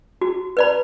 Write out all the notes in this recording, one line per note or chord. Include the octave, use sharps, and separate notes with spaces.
F#4
B4 D5 B5